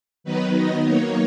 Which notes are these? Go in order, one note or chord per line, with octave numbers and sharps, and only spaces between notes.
D#3 F#3 B3 D#4 B4
D#5
F#3 A#3 D#4 C#5